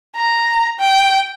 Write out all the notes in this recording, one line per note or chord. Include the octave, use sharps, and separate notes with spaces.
A#5
G5